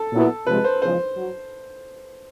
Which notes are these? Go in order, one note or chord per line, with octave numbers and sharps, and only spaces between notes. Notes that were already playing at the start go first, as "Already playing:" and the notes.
Already playing: A4
A#2 F#3 B3 E4
C3 F3 G#3 B4
C5
E2 C#3 F3 G#3 C5
F#3